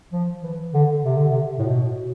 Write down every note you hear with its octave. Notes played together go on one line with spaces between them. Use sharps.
F3
E3
D3
C3
D3
C3
A2
B2